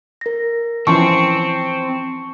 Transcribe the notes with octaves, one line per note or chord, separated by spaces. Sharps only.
A#4 A#6
E3 F3 C4 C#4 A5 C#6 C#7